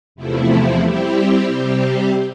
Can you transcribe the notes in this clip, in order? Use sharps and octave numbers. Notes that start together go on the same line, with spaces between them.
E2 C3 F3 A3 E4
G3 C4 E4 G4
C3 G3 C4 G4